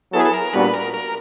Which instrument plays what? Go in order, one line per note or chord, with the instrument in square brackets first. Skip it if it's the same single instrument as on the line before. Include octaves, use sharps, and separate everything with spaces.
[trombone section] F#3 B3 E4 G#4 B4 [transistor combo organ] A4
[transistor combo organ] A4
A#4
[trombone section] A#2 G3 B3 D4 F#4 [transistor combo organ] B4
[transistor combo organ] A#4
A#4